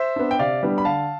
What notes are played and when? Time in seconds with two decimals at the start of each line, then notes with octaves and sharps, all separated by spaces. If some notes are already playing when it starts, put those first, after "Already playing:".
Already playing: C5 E5
0.16 B3 D4
0.31 G5
0.39 C3 D5 F5
0.63 G3 B3 D4
0.78 B5
0.85 D3 F5 A5